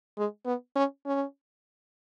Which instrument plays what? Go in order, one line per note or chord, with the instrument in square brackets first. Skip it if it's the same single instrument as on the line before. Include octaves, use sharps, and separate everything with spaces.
[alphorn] G#3
B3
C#4
C#4